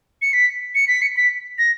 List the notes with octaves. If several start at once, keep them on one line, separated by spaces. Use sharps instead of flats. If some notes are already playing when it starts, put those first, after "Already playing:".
C#7
B6
C#7
B6
C#7
B6
A#6